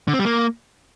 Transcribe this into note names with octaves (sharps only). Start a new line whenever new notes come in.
D3
C4
G3
A#3